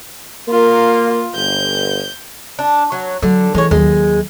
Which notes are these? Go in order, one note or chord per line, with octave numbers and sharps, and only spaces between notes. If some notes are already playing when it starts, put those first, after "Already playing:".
A#3 F4 A#4
G1 G6
D4
F#3
D3 F#3
E3 G#3 C#5
D#2 F#3 G#3